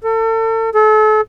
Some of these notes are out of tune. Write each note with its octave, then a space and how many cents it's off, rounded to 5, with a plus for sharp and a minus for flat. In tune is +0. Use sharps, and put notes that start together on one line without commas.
A4 +35
A4 -35